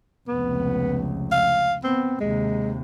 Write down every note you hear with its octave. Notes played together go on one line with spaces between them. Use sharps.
F1 C#2 B3
F5
B3 C4
D#2 C3 G#3